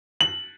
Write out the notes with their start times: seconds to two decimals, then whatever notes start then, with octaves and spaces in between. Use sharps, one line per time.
0.21 F#7